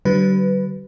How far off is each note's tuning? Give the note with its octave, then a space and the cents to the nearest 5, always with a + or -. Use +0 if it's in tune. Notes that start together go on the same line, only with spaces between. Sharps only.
D3 +0 G3 -45 B4 +10